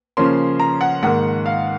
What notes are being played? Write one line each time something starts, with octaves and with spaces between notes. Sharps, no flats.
C#3 F3 A#3 C#4 C6
A#5
F#5
G#2 D#3 A#3 F#5
F5